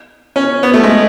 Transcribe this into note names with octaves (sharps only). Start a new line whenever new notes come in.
C#4
B3
A3
G#3